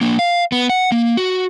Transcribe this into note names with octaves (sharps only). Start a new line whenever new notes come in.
A#3 D4
F5
B3
F#5
A#3
F#4